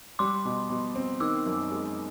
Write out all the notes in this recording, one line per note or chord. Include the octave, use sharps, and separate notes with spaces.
G3 C6 D6
B2
B2
C4
D#3 D6 E6
F#2
G#3